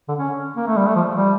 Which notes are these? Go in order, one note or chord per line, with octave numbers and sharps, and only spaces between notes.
D3
C#4
A#3
A3
G3
A3
F3
G3